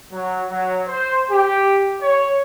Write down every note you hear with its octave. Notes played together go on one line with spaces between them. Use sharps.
F#3
F#3
C5
G4
C#5